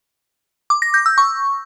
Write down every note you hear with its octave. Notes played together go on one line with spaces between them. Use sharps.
D6
A#6
G6
E6
C#6